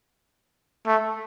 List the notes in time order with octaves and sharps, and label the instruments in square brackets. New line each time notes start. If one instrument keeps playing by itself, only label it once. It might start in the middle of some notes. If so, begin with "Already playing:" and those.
[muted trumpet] A3